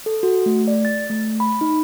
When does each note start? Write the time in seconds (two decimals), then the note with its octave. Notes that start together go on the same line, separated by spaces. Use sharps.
0.06 A4
0.23 F#4
0.46 A3
0.68 D5
0.85 A6
1.10 A3
1.40 B5
1.61 D#4